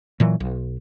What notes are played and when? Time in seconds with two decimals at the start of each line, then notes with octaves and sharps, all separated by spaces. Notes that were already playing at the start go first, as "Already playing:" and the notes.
0.20 A#2 E3 F#3
0.40 B1